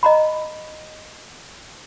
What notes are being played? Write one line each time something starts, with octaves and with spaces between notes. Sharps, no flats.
D#5 A#5 B5